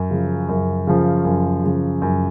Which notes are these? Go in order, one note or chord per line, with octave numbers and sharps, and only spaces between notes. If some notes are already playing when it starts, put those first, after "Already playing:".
Already playing: F#2
C#3 F3
F#2
C#3 F3
F#2
C#3 F3
F#2